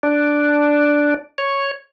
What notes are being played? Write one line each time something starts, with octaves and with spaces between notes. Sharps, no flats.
D4
C#5